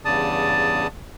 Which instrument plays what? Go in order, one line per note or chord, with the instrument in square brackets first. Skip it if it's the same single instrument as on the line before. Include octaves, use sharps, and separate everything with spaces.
[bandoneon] E2 G2 C#3 D5 A5 D#6